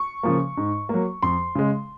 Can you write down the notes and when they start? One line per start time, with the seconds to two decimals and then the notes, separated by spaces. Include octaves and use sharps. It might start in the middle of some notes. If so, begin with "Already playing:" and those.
Already playing: C#6
0.23 C#3 F3 A#3
0.57 G#2
0.89 F#3 A#3
1.23 F2 C6
1.55 C#3 G#3